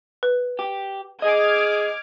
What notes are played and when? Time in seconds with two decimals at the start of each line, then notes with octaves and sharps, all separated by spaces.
0.23 B4
0.59 G4
1.22 G#4 D#5 D6 F6 G#6